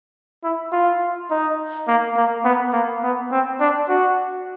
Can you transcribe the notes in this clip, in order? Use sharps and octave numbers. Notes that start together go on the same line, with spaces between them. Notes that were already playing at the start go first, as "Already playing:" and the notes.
E4
F4
D#4
A#3
A#3
B3
A#3
B3
C4
D4
F#4